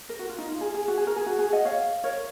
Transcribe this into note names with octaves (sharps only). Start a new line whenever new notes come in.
A#4
F#4
F4
D#4
F4
G#4
G#4
F#4
G#4
A#4
G#4
F#4
G#4
D#5 F#5
C#5 F5
A#4 C#5